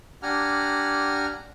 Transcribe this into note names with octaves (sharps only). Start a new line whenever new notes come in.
D4 G4 F#5 G#5 A#5 F6